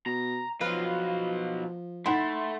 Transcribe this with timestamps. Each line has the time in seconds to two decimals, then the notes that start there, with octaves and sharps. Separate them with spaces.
0.06 B2 A#5
0.61 B2 F3 F#3 F4 B4 F5
2.06 A3 D#4 E4 F#5 C6